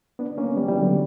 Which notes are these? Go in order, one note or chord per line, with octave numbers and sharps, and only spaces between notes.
B3 D4
A#3 C#4
G3 B3
E3 G3
D3 F#3